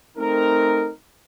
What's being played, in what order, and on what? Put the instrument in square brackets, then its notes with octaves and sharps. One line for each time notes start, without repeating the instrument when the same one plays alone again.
[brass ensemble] A3 C4 D#4 A#4